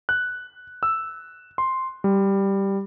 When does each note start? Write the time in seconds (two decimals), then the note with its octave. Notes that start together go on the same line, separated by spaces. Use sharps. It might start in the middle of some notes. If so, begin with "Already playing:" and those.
0.09 F#6
0.83 E6
1.58 C6
2.04 G3